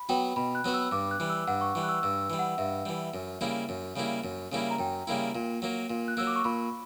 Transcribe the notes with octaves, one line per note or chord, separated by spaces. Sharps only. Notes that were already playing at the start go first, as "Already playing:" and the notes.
Already playing: B5
F#3 B3 F#4 G5
B2 B5
F#6
F#3 B3 F#4
E6
G2 D6
F#6
E3 G3
E6
G2 F#5
C#6
E3 G3
F#6
E6
G2 E6
E3 G3
F#5
G2 E5
E3 G3
F#2
C#3 G3 A#3 E4
F#2
C#3 G3 A#3 E4
F#2
C#3 G3 A#3 E4
A#5
F#2 G5
C#3 G3 A#3 E4
A#2
F#3 A#3
A#2
F#6
F#3 A#3 E6
D6
C#6
A#2 B5